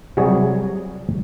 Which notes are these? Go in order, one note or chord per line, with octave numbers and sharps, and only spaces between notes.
C3 F#3 G3 G#4 C#5